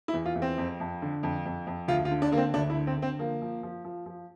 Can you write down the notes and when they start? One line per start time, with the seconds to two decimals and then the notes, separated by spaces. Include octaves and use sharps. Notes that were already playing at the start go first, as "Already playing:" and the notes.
0.08 E4
0.14 E2
0.26 F4
0.35 E2
0.42 C4
0.58 F2
0.80 F2
1.02 D3
1.23 F2
1.46 F2
1.67 F2
1.88 D2 F4
2.05 F4
2.11 D3
2.22 D4
2.32 D3 A#3
2.37 C4
2.54 D2 D4
2.70 E4
2.75 D3
2.87 C4
2.97 D3
3.02 C4
3.19 F3 A#3
3.42 F3
3.63 F3
3.84 F3
4.06 F3